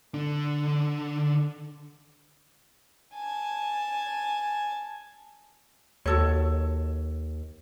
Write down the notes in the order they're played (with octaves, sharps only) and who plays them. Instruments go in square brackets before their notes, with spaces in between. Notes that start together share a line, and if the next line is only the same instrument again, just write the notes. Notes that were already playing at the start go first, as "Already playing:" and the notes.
[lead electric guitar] D3 D4
[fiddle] G#5 A5
[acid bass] D#2 [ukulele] F#4 A4 C#5